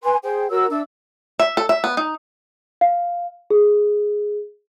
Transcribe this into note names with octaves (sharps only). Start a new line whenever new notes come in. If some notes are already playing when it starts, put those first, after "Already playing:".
B4 G#5 C6
G#4 C5 G5
F#4 A#4 C#5 E6
D4 E5 E6
E5
A4
E5
B3
D#4
F5
G#4